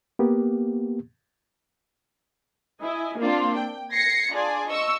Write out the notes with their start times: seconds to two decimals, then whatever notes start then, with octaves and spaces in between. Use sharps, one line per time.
0.19 A#3 B3 G4
2.82 E4 D#5 G#5
3.18 A#3 C4 D4 F4
3.56 G5
3.91 G#6 A#6 C7 C#7
4.32 D4 F4 G#4 D5 G#5
4.69 D#5 C#6 E6